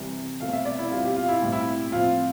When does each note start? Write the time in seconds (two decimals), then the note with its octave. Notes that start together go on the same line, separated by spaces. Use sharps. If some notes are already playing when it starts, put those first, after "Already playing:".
Already playing: C3 E3 G3
0.41 B2 A3 C4 F5
0.53 E5
0.65 D5
0.79 E4
0.91 B2 G3 C4 F4
1.04 G4
1.16 F4
1.28 E4
1.42 A2 G3 C4
1.52 E4
1.92 A2 F3 C4 F4